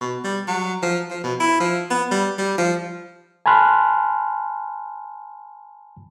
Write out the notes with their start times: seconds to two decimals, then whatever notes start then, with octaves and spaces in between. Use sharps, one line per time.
0.01 B2
0.24 G3
0.47 F#3
0.83 F3
1.10 F3
1.24 B2
1.40 E4
1.60 F3
1.91 B3
2.11 G3
2.38 G3
2.58 F3
3.46 G#5 A5 B5 C6 F6 F#6